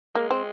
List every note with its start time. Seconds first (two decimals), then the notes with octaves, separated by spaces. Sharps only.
0.15 G#3 A#3
0.31 C4